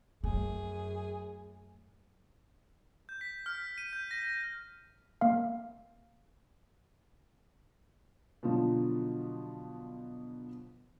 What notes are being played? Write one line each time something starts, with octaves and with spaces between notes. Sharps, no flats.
F#2 A3 G#4
G6
B6
F6
D#7
G6
A#6
A#3 F5
B2 D3 F3 F#3